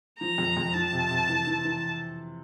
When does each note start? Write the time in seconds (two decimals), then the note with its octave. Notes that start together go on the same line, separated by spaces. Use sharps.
0.20 F3 A#5
0.38 F2
0.57 F2
0.74 F3 A5
0.93 C3
1.11 C3
1.29 E3
1.47 E3
1.65 E3